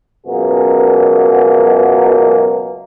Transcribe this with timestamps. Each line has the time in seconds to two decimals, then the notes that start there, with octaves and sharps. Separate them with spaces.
0.26 C#2 F#2 B2 A#3 F#4 G#4